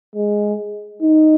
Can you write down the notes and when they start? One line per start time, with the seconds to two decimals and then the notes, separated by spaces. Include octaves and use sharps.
0.16 G#3
1.02 D#4